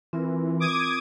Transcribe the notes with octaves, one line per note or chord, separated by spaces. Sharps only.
E3 C4 F4 A#4
D6 D#6 G#6